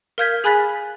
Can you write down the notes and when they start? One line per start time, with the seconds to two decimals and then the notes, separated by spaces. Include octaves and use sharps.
0.18 A#4 F5 F6 G6 G#6 B6
0.44 G#4 G#5 B5 F#6 A6 B6